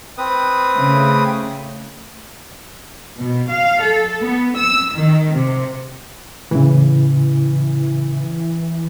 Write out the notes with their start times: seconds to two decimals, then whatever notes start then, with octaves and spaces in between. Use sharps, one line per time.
0.18 C4 B4 D#6
0.74 C#3 A3
3.17 B2
3.50 F5
3.82 A4
4.20 B3
4.57 E6
4.93 D#3
5.32 C3
6.51 A2 C#3 E3